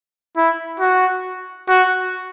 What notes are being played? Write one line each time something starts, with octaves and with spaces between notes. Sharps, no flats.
E4
F#4
F#4